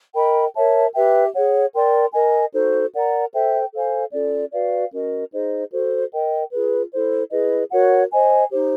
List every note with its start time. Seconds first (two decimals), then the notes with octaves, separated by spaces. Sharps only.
0.14 A#4 D#5 G5 B5
0.54 A#4 C#5 E5 A5
0.95 G4 B4 E5 G5
1.33 G#4 C#5 F#5
1.73 A#4 D5 G5 C6
2.14 A#4 D#5 G#5
2.53 D#4 F#4 A4 C5
2.94 A#4 D5 F#5 A#5
3.33 A4 C5 E5 G5
3.73 A4 C5 F5 G#5
4.12 C#4 F4 A4 D5
4.53 F#4 B4 D5 F5
4.92 C#4 F#4 A#4 D#5
5.33 D#4 G#4 C5 D#5
5.72 F#4 A4 C5
6.12 A#4 D#5 G5
6.51 F4 G#4 B4
6.92 E4 A4 C5
7.31 E4 G#4 B4 D#5
7.71 F#4 A#4 C#5 F#5
8.12 C5 D#5 G#5
8.51 D#4 G4 C5